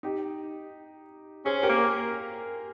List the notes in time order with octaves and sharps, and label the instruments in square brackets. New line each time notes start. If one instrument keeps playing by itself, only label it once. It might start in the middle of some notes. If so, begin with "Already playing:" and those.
[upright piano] D#4 G4
[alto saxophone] C#4 [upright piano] G#4 C5
[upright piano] G4 A#4
[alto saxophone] A#3